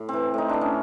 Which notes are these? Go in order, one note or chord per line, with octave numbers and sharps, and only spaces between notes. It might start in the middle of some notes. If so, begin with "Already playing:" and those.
Already playing: A2
E3 C4
A2 D#4
A2 D4
C#4